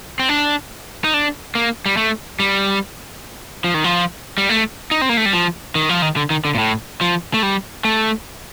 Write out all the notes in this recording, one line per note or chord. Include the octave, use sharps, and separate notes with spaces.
C4
D4
D#4
D4
A#3
G3
A3
G3
F3
D#3
F3
G3
A3
D#4
C4
A#3
A3
G3
F3
D#3
F3
D#3
D3
D#3
D3
A#2
A2
F3
A3
G3
A3